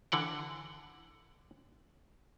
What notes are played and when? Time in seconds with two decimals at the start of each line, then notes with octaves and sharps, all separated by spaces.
0.12 D3 E3 F#5 G5